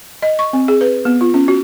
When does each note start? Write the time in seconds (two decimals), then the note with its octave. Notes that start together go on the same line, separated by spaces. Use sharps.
0.23 D#5
0.39 C#6
0.53 C4
0.68 G#4
0.81 B4
1.05 B3
1.21 F4
1.34 C#4
1.48 F#4